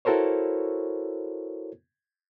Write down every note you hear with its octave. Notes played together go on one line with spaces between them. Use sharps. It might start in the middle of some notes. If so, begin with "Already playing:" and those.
E4 F#4 A4 A#4 C5 C#5